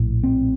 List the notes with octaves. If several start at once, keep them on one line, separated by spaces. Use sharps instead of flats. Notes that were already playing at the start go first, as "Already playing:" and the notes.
Already playing: A#1 A2
C4